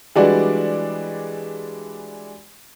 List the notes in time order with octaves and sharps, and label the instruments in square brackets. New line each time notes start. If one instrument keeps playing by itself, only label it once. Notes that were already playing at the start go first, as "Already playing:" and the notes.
[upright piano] E3 G3 G#3 D4 F#4 D5